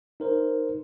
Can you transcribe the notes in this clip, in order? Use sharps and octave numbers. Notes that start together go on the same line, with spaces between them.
D#4 A#4 C5